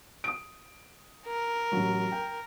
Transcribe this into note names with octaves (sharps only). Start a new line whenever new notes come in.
D#6 D7
A#4
A1 F#3
G5